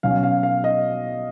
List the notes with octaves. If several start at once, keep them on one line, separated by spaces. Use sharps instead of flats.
B2 F#3 C#4 F5
F5
F5
D#5